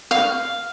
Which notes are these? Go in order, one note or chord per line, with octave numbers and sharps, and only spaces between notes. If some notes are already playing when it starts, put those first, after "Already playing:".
F5